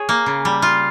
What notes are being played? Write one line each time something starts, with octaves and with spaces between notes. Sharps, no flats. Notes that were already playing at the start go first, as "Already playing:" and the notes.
Already playing: G#4 C#5
A#3
C#3
G3
F4